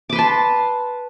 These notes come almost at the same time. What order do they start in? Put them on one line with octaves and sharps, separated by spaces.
D6 B4 C6 A5